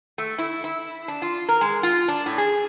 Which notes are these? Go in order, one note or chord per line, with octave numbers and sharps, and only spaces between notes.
A3
E4
E4
D4
F4
A#4
G#3
F4
D4
A2
G#4